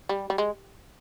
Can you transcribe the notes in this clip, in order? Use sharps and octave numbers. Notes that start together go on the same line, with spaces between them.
G3
G3
G#3